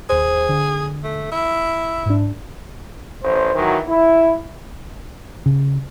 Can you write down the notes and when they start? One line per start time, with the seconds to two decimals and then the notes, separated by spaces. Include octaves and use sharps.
0.09 D#2 G#4 C5
0.49 D3
1.04 A3
1.32 E4 E6
2.06 G#2 D4
3.23 A1 C5
3.55 D#3 E3 F#3
3.88 E4
5.46 C#3